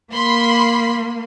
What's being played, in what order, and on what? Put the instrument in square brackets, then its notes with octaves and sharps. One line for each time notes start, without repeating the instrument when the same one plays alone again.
[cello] A#3 [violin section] B5 C6